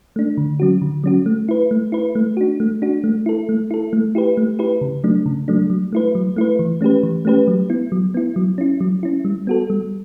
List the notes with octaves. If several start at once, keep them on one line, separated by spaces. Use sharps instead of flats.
A3 D4
D3
F#3 C#4 F#4
D3
F#3 C#4 F#4
A3
E4 B4
A3
E4 B4
A3
D4 F#4
A3
D4 F#4
A3
E4 A4
A3
E4 A4
A3
E4 G4 B4
A3
E4 G4 B4
C#3
F#3 A3 D4
C#3
F#3 A3 D4
F#3
A3 E4 B4
F#3
A3 E4 B4
E3
A3 C#4 G4 B4
E3
A3 C#4 G4 B4
F#3
B3 E4
F#3
B3 E4
F#3
C#4 E4
F#3
C#4 E4
G3
B3 F#4 A4
G3